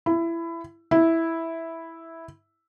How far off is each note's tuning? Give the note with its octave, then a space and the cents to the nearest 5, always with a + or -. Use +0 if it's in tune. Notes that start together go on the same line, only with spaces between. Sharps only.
E4 +20
E4 -5